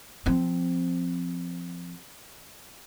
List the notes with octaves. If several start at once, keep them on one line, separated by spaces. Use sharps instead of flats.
F3 C4